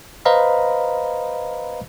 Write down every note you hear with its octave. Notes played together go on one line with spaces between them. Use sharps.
B4 C5 D#5 F5 A#5 B5